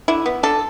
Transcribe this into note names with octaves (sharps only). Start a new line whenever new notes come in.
D3 E4
B3
D3 A4